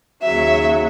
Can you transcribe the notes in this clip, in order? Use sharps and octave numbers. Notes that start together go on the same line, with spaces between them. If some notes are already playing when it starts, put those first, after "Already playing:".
D#2 C#3 F#3 E5